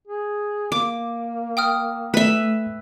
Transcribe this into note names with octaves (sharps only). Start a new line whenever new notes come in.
G#4
A#3 D6
G5 D#6 F6
A3 B4 E5